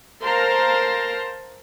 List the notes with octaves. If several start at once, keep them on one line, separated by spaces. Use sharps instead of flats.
A#4 C5 F5 A5 A#5 C6